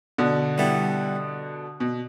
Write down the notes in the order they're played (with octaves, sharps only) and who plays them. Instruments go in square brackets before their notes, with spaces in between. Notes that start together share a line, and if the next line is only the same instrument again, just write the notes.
[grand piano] B2 D3
[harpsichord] G3 B3 E4 A4
[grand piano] B2